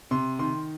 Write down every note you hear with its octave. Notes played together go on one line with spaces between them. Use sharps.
C3 C6
D#3 C6